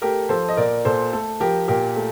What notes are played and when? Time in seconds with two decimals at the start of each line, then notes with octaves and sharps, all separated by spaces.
0.02 A3 G4 A#4
0.29 F3 A4 C5
0.49 D#5
0.57 A#2 A#4 D5
0.85 A#2 A4 C5
1.13 A3 A4
1.40 F3 G4 A#4
1.68 A#2 G4 A#4
1.96 A3